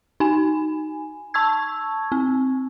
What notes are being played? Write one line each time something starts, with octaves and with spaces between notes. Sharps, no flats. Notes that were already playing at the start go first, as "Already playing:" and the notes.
D#4 G#5
A5 C#6 E6 G#6
C4